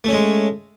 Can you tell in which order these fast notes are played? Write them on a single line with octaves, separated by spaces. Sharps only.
A3 C#4 G#3